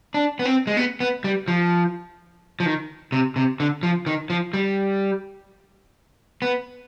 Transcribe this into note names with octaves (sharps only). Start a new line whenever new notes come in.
D4
B3
C4
G#3
B3
B3
G3
F3
F3
D#3
C3
C3
D3
F3
D#3
F3
G3
B3